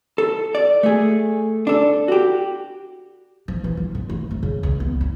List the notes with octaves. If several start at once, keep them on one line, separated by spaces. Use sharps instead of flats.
A4
D5
A3 G#4
D4 A4
F#4 G4
F3
E3
F4
D3
A3
F3
C#3
C#2
B3
C#4